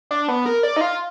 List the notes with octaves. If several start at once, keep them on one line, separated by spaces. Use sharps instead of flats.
D4
B3
A#4
D5
D#4
F4